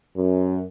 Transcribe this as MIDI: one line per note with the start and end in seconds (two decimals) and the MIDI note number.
0.17 0.64 42